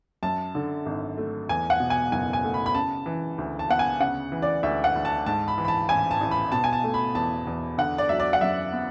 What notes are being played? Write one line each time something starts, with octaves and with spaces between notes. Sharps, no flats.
F#2 A5
D3
G#1
A3
E2 G#5
F#5
B2
G#5
F#1 G#5
G#5
A3
B5
B5
C#3 A5
E3
D2
A5
B3 F#5
G#5
C#3 F#5
E3
D5
D2 E5
F#5
D2
A5
G#2 A5
B5
E3
B5
A5
A1 G#5
A5
A1
B5
B2 A5
G#5
A5
A3
B5
E2 A5
E2
D3 F#5
D5
F#3 E5
D5
F#5
F#2 E5
B3